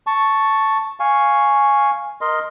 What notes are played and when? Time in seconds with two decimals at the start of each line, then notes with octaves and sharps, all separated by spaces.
0.07 A5 C#6
1.00 F5 G#5 C#6
2.21 A#4 D#5 C6